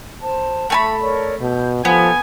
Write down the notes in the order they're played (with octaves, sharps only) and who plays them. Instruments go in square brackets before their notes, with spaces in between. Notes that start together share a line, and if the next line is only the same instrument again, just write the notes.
[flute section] C5 A5
[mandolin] A3 G#5 B5 [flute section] E5
[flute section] A#4 C#5 D5
[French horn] B2 [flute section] G6
[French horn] F3 [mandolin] B3 [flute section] G4 A4 [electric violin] G#5